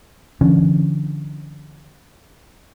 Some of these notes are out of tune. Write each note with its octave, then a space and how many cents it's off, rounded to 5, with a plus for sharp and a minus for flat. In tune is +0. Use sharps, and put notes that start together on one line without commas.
D3 +0 F3 -45 C#4 +0